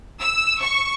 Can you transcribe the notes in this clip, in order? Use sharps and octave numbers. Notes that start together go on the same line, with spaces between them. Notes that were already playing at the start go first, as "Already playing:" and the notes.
E6
C#6